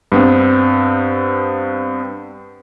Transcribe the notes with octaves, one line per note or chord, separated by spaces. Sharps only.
G2 B3 C4